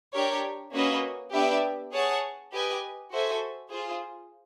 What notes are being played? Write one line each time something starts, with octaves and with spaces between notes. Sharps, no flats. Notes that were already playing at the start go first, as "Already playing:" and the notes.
D4 G4 A#4 C#5
A#3 C#4 F#4 B4 D#5
B3 D4 G4 B4 E5
G#4 C#5 F#5 A5
G4 B4 D#5 G#5
F#4 A4 C5 E5 G#5
F4 G#4 C5